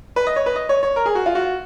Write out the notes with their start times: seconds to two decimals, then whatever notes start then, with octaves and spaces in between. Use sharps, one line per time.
0.16 B4
0.27 D#5
0.36 C#5
0.46 B4
0.56 D#5
0.69 C#5
0.83 C#5
0.96 A#4
1.06 G#4
1.15 F#4
1.26 F4
1.35 F#4